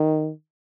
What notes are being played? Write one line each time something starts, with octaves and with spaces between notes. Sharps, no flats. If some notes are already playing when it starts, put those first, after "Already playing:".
Already playing: D#3